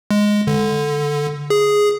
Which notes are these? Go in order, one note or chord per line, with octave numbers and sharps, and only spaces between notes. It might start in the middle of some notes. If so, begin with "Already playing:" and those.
G#3
D3
G#4